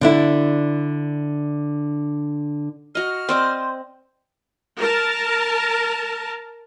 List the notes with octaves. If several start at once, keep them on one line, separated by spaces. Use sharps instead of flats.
D3 D4 E4
F#4 D#5 F6
C4 C5 D5 D#5
A#4 A5